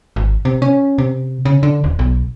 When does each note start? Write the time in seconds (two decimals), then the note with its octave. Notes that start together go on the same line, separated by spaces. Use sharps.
0.16 G#1
0.45 C3
0.62 C#4
0.98 C3
1.45 C#3
1.63 D3
1.84 D#1
1.99 B1